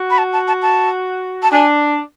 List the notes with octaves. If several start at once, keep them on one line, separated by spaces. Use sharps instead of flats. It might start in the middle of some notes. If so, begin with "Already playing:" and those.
Already playing: F#4
B5
A5
A5
A5
A5
A5
D4 G#5